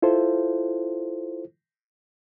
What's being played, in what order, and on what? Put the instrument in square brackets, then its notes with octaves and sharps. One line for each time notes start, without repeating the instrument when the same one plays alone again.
[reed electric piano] E4 F4 A4 C5